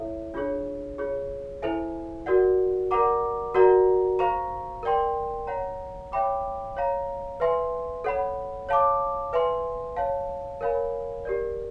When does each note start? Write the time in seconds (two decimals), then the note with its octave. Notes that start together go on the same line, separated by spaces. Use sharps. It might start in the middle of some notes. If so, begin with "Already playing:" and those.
Already playing: E4 A4 C#5 E5
0.34 D4 F4 G#4 C#5
0.98 F4 G#4 C#5
1.62 E4 A4 C5 E5 G#5
2.26 F#4 A#4 D5 F#5
2.91 A#4 D5 F#5 A#5 D6
3.54 F#4 A#4 D5 F#5 A#5
4.19 C5 F5 A#5 C#6
4.83 A#4 D5 G5 C6
5.47 C#5 F#5 A#5
6.12 C#5 E5 G5 B5 D6
6.76 C#5 F5 A#5
7.40 B4 E5 G#5 C6
8.04 A4 C#5 F#5 B5
8.69 C#5 F5 A5 D6
9.33 B4 E5 G#5 C6
9.96 C#5 F5 A5
10.61 A#4 C#5 F5 G#5 B5
11.25 G4 A#4 D5